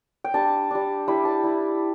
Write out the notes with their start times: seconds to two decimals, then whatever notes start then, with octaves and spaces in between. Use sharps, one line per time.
0.24 G5
0.34 G3 D4 A5
0.71 G3 D4
1.08 G3 E4 B5
1.25 A5
1.43 G3 E4